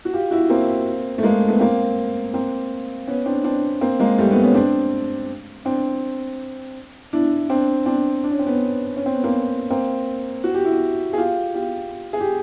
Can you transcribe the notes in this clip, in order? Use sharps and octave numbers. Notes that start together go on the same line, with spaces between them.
F#4
F4 G4
E4 F#4
A#3 C4
A3
G#3 A#3
A3 B3
A#3 C4
A#3 C4
B3 C#4
C4 D4
C4 D4
A#3 C4
G#3 A#3
G3 A3
A3 B3
B3 C#4
C4 D4
C4 D4
D4 E4
C4 D4
C4 D4
D4
C#4
C4
B3 C#4
C#4
C4
B3
A#3 C4
A#3 C4
F#4
G4
E4 F#4
G#4
F4 G4
F4 G4
G#4
G4